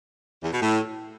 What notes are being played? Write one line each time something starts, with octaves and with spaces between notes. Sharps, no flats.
E2
B2
A2